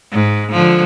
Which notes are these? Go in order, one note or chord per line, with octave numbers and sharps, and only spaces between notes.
G#2
D3 F3 G#3